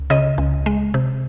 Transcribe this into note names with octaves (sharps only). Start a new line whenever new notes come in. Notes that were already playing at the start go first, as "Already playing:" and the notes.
Already playing: C#2
C#3 D#5
C#2
G#3
C3